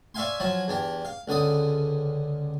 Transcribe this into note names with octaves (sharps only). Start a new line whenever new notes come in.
C#5 D5 E5 F5 G#5 C6
F3 F#3 F4 G#5
E2 D4 G4
F5
C#2 D3 D5 D#6